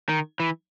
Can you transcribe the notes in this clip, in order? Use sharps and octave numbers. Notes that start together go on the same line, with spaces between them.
D#3
E3